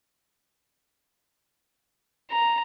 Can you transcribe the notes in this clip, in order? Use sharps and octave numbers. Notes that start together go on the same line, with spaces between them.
A#5